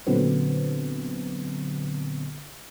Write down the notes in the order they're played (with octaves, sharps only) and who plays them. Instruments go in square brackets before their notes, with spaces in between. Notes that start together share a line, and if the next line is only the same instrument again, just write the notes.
[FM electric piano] A#2 D3 F#3 B3 C4